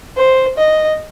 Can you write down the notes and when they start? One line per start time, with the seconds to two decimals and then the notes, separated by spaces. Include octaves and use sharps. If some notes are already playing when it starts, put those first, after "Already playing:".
0.17 C5
0.58 D#5